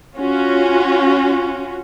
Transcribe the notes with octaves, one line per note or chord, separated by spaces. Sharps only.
C#4 F4 F#4